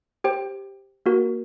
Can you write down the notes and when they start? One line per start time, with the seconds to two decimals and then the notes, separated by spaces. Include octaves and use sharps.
0.24 G4 C5 G5
1.06 A#3 F#4 A#4